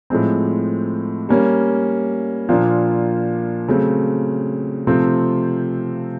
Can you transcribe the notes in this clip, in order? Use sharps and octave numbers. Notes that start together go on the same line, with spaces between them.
A2 F3 G#3 C4
G3 A#3 C#4
A#2 F3 A#3 D4 F4
C#3 F#3 A3 C4
C3 F3 A3 C4 F4